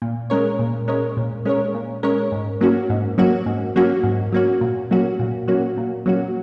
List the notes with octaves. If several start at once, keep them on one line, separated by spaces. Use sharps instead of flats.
A#2
G#3 C#4 A#4 C#5
A#2
G#3 C#4 A#4 C#5
A#2
G#3 C#4 A#4 C#5
A#2
G#3 C#4 A#4 C#5
G#2
F#3 A#3 C#4 F#4
G#2
F#3 A#3 C#4 F#4
G#2
F#3 A#3 C#4 F#4
G#2
F#3 A#3 C#4 F#4
A#2
F#3 A#3 C#4 F#4
A#2
F#3 A#3 C#4 F#4
A#2
F#3 A#3 C#4 F#4